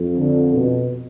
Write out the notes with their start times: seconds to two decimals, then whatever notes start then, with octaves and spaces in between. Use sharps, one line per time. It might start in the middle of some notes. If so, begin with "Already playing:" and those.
Already playing: F2
0.18 D3
0.54 B2